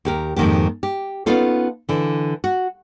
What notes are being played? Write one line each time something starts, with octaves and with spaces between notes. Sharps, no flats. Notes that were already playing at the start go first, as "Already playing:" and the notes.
D#2 G4 A#4
F2 G#2 D#3 A#3 G4
G4
B3 C#4 D#4 F4 A4
D3 E3
F#4